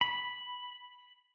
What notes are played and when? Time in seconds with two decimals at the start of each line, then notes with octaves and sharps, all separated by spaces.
0.01 B5